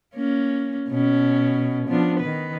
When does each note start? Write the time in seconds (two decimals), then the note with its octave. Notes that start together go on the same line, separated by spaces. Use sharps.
0.15 A#3 C#4
0.89 B2 C#4
1.88 F3 B3 D4
2.20 D#3 B4